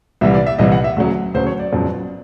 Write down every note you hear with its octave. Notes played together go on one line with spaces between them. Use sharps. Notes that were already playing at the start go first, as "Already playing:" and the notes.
C2 C3 E3 G3 E5
D5
E5
C2 C3 E3 G3 D#5
F#5
E5
D2 C#3 F#3
D2 C#3 F#3 C5
C#5
D5
G1 F2 C#3 F#3